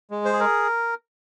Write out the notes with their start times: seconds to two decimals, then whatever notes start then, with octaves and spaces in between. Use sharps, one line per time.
0.11 G#3
0.25 C5
0.33 G#4
0.40 A#4